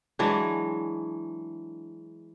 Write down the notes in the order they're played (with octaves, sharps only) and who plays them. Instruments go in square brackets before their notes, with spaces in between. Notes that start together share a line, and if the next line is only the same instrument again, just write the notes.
[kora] E3 F#3 G#3 D4